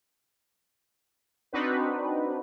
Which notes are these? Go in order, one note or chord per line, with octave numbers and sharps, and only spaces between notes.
C4 D4 D#4 F#4 B4